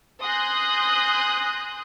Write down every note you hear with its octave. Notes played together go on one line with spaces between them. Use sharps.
G#5 C6 D#6 F#6 G6 A#6